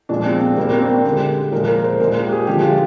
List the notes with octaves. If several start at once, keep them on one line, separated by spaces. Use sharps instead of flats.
A#2 F3 G#3 D4
C4
C4
A#2 G3 A#3
C4
D4
C4
D3 G#3 G4
A#2 F3 G#3 A#4
A#4
C5
A#2 G#3 A#4
G4
G#4
D3 F3 G#3 G4
F4